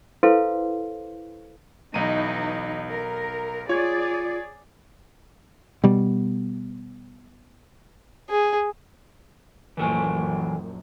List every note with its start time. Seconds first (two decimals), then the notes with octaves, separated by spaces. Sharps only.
0.23 E4 A4 B4 C5 F5 C6
1.94 B1 E3 D#4 A#5 D#7
2.90 A#4
3.69 F4 G#4 C#5 D5 G#6
5.84 B2 G3
8.29 G#4
9.77 A#1 F#2 E3 A4 G#5